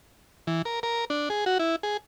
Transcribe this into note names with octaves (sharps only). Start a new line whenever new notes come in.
E3
A#4
A#4
D4
G#4
F#4
E4
G#4